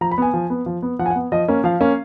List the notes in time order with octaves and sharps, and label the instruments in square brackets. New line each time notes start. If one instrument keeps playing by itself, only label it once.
[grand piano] F3 A#5
B5
B3 G#5
F3
B3
F3
B3
F3 F#5
G#5
F#5
B3
F3 D#5
A#3 C#4
F3 F5
A#3 C#4